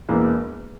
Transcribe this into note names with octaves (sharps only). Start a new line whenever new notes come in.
E1 E2 C#3 E3 A#3